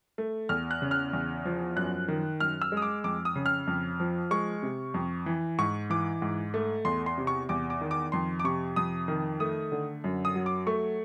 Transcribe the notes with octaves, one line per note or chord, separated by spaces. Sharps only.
A3
E2 F6
F#6
C#3
F6
E2
F3
F#2 F#6
D#3
F#2 F6
E6
G#3
D#6
D6
F2 D6
D#6
C#3
F6
F2
F3
G#3 C#6
C3
F2
E3
G#2 C#6
E3 D6
G#2
A3
E2 C6
C6
C3
C#6
E2 D6
D6
D#3
D6
F2 C6
D6
C3 C#6
F2 D#6
D#3
A3 D#6
D3
F#2
D#6
F#3
D6
A3 C#6